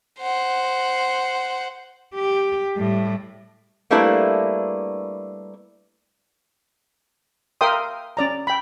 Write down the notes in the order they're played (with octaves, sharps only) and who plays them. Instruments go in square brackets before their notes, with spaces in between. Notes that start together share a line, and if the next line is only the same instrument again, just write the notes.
[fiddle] C5 F#5
[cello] G4
A2 G3
[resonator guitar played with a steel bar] G3 A3 A#3 D4 E4 B4
[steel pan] A#4 E5 F5 G5 C6 D#6
C#4 D5 A#5
G5 B5